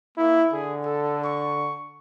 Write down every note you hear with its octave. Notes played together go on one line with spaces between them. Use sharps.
A#3 E4
D3 G#4
A4
C#6